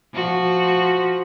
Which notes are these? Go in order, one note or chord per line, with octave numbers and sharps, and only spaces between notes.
F3 F#4